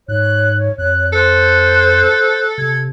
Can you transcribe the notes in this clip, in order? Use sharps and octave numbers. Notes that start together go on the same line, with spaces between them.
G#2 C#5 F#6
F2 F#6
A4 C5 F#6
C3 G#6